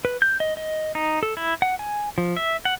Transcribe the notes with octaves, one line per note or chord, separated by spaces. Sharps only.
B4
G6
D#5
D#5
D#4
A4
E4
F#5
G#5
F3
E5
F#5